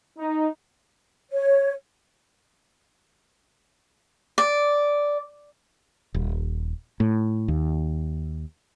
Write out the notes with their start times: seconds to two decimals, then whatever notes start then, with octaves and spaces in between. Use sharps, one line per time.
0.19 D#4
1.31 C#5
4.38 D5
6.14 D#1
7.00 A2
7.48 D#2